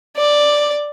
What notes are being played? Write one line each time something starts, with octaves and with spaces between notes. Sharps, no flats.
D5